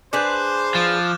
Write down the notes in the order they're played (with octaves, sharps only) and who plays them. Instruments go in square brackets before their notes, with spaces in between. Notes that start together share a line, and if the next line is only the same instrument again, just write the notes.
[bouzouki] D4 G#4 B4 [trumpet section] C5 [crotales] D6 F#6 G6
[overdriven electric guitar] F3 [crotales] F6 A6 E7